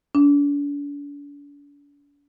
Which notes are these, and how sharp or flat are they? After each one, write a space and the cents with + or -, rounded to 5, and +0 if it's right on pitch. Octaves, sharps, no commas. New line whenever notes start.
D4 -40